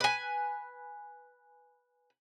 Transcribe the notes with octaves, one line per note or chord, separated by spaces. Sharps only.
B4 G#5